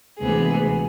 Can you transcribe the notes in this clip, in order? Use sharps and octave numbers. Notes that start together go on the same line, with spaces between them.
D2 C3 E3 G#3 B3 G#4